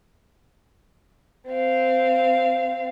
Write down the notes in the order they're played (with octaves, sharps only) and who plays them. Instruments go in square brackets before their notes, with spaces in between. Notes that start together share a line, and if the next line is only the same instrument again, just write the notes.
[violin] C4 F5